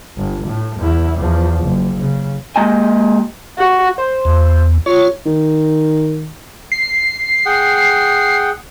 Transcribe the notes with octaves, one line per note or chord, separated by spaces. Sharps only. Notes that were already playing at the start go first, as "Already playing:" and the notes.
G1
A2
E2 E4
E2 F3
F#1
C#3
G#3 A#3 G4 D#5 G5 G#5
F#4
C5
E2
F4 C#5
D#3
C7
G#4 F#5 G5